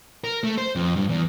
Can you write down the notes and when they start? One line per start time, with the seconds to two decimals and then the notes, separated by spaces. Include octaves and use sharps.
0.24 A#4
0.44 A3
0.57 C5
0.76 F2
0.96 G2
1.09 E2